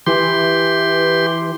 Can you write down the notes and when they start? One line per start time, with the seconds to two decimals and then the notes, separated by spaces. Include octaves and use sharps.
0.06 E3 G4 C6